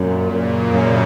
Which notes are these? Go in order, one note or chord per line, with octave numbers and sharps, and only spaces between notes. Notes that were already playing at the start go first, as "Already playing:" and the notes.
Already playing: F#2 A#2
F#2 C#3
F#2 C3